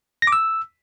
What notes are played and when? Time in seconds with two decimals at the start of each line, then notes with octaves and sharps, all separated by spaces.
0.22 A#6
0.27 D6
0.32 E6